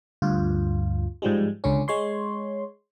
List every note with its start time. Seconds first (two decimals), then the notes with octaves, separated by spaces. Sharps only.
0.22 D2 G2 F4
1.22 G#2 F3 G3 G#3
1.64 C#2 D3 C#4
1.88 G#3 C#5 C6